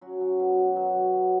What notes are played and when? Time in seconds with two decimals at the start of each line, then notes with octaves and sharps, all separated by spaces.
0.01 F#3 C#4 F#4
0.21 F#3
0.40 B2
0.58 B2
0.76 F#3
0.96 F#3
1.13 F#3